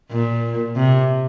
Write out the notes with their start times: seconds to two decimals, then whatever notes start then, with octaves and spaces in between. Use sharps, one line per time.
0.11 A#2
0.76 C3